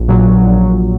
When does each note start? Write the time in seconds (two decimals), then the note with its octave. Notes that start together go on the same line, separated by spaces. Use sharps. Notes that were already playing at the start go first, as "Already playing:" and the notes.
Already playing: A#1
0.08 A#2 F#3
0.46 A#1